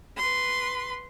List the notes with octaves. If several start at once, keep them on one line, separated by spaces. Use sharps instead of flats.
B4 C6